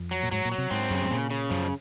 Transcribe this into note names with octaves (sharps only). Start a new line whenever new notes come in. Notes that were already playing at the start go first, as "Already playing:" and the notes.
Already playing: F2
F#3
A#2
G#2 F#3
A#2
F#3
C3
G#2 C4
F#2 C#3
G#2
A#2 C#3
C#3
F#2 F3